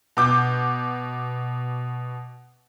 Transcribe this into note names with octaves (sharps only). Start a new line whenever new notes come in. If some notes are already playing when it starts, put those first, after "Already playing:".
B2 D6 G6